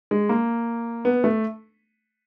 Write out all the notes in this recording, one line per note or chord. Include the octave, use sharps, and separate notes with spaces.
G#3
A#3
B3
A3